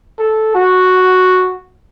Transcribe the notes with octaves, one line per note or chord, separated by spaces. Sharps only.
A4
F#4